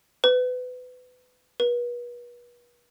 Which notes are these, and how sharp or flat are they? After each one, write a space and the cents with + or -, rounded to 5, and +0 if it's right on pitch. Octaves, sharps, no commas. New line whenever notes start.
B4 +25
B4 -35